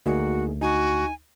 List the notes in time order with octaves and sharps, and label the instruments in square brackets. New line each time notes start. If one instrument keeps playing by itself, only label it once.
[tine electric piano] D2 [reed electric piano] A#3 D#4 G#4 [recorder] F#4
[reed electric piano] D#4 [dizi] F#4 [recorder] G#5